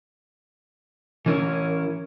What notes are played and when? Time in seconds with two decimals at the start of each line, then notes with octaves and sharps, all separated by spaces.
1.26 E3 C#4 E4 A#4